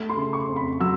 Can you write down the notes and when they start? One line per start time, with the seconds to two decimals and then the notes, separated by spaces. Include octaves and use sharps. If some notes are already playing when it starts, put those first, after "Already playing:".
Already playing: A3
0.09 C6
0.17 C#3
0.33 C#6
0.49 F2
0.56 B5
0.80 F#3 E6